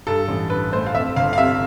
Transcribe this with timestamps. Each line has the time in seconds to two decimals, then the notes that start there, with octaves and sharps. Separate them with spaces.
0.07 G2 A4
0.28 A1
0.50 D3 B4
0.72 A3 C5
0.86 F5
0.95 F2 E5
1.16 G1 F5
1.33 F5
1.38 C3 E5